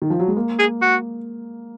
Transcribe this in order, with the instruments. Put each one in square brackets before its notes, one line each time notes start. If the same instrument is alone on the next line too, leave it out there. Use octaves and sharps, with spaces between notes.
[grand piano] D#3
F3
F#3
G#3
A#3
[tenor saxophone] G#4
F#4